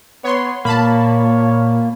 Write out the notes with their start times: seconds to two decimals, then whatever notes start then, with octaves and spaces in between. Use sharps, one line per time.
0.24 B3 C#5 C6
0.65 A#2 A#3 C#5 A5 B5